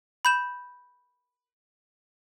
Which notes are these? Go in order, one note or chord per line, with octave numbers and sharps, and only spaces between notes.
B5 G6 E7